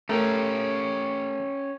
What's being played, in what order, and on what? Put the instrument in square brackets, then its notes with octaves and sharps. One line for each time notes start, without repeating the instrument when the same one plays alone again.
[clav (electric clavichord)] A3 A#4 [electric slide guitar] C#4 G4